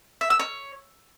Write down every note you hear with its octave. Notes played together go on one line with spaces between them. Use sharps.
E5
E6
C#5